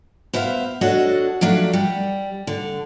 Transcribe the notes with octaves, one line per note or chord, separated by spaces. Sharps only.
B3 C5 E5 F5
D4 F#4 A4 C#5 D#5
F3 F#3 A3 D4
G3
D3